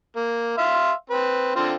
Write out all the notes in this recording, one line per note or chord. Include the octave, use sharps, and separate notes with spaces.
A#3
E5 F5 C6
C4 B4
D3 C4 F4